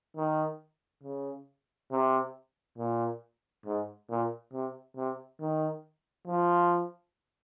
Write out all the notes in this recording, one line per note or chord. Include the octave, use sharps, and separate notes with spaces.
D#3
C#3
C3
A#2
G#2
A#2
C3
C3
D#3
F3